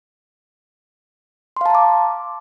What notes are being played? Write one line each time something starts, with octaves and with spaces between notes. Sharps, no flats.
F5 A5 A#5 C6 D6